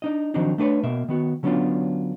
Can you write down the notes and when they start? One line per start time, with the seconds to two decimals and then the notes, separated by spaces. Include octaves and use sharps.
0.02 D4 D#4 D#5
0.34 D#3 F3 F#3 C4 D4 D#4
0.58 A3 D4 B4 C#5
0.83 B2 A#3 E5
1.08 D#3 B3 F#4
1.43 D3 F#3 B3 C#4 D4 F4